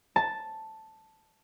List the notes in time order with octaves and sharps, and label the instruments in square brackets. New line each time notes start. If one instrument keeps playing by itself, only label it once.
[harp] A5